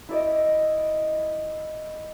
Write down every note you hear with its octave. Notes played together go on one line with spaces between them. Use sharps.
E4 D5 D#5